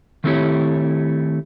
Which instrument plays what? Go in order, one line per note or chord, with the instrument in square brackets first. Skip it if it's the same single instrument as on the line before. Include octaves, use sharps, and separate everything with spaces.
[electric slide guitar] D#3 A3 C4 E4 G4 C#5